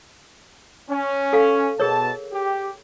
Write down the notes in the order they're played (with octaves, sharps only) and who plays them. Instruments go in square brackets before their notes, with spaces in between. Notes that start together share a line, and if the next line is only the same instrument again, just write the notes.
[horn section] C#4
[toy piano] A4 F5
[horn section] B2 A5 [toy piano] G#4 A#4 C#5
[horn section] G4